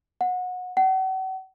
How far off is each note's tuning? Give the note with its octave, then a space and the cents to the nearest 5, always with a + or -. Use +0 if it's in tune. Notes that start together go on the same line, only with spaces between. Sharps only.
F#5 -25
F#5 +40